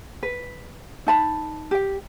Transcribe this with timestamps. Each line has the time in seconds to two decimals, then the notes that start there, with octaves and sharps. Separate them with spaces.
0.23 B4
1.07 D#4 A5 B5
1.71 G4 G5